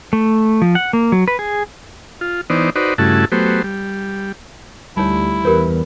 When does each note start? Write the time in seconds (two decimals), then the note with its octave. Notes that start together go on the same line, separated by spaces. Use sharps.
0.13 A3
0.62 F3
0.75 F#5
0.93 A#3
1.12 F#3
1.28 B4
1.39 G#4
2.21 F4
2.50 E3 B3 D#4 C5 D5
2.76 D#4 F#4 B4 C5 D5
2.98 G2 C#3 A3 E4 F#4 A5
3.32 F#3 A3 B3 G4 C5
3.64 G3
4.97 D2 G3 D#4 E4 C#5
5.45 E2 G4 A#4 B4 C#5